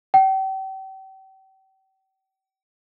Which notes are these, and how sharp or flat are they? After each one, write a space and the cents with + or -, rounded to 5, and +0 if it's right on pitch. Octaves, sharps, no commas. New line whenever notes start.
G5 -40